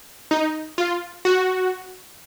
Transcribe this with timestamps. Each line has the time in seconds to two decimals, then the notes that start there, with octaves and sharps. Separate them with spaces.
0.31 D#4
0.78 F4
1.25 F#4